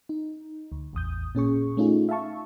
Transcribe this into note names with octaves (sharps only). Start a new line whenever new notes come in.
D#4
D2
A1 E2 D#6 G6
A#2 C#4 G#4 C#6
A3 C#4 D#4 F4 G#4
E5 F5 A5 C#6